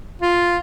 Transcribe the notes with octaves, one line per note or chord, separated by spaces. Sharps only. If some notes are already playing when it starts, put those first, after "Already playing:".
F4